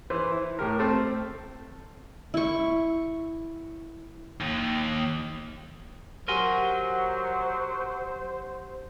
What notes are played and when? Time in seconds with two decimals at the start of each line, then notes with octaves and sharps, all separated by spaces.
0.10 E3 B4 C5
0.32 E4
0.59 A2 G4 A#4
0.79 A3 C4 A4
2.34 E4 C#6
4.41 D#2
6.28 F#3 G4 A#4 C5 F#5 G#5 C6 A#6